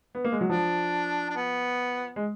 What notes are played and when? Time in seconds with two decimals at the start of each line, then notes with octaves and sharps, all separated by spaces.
0.15 B3
0.25 A#3
0.32 G#3
0.41 F#3
0.49 F3 D4
1.30 D4
1.36 B3
2.16 G#3